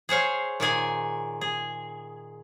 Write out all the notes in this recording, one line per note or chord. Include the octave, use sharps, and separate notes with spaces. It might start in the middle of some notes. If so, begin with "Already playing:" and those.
G#4 C5 C#5 F5
A#2 D#3 G#4 G#5
G#4